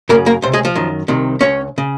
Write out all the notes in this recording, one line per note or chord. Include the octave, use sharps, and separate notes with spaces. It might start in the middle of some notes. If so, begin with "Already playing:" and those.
F#2 C#3 A#3 A#4
A#3 A#4
C#2 C3 C5
G#3 G#4
F3 F4
F#2 D#3
C2 C3 D#3
C#2 C#3 C#4 C#5
C#3